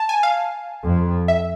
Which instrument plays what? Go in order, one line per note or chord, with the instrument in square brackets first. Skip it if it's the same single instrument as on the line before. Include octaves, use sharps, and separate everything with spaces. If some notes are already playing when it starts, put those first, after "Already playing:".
Already playing: [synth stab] A5
G#5
F5
[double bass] F2
[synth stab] E5